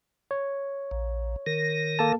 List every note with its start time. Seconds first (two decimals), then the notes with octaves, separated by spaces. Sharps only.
0.31 C#5
0.91 A#1
1.47 D#3 A#4
1.99 A#3 A4 A5